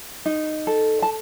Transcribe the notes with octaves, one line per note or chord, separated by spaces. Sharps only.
D#4
A4
A5